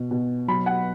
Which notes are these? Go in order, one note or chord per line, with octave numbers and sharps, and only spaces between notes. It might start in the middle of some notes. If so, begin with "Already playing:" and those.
Already playing: B2
B2
F#3 B5
F#5